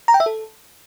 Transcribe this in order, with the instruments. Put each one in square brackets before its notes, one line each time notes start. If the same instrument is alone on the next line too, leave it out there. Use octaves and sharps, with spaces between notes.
[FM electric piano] A#5
G5
E5
A4